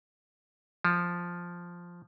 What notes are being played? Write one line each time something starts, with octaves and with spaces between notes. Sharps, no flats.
F3